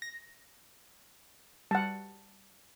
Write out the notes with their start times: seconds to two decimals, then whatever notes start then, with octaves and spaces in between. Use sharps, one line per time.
0.02 A#6
1.71 G3 F#5 A5